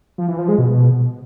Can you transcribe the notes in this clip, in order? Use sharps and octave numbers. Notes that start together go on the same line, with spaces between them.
F3
E3
F3
G#3
B2